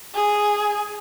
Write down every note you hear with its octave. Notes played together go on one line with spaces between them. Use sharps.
G#4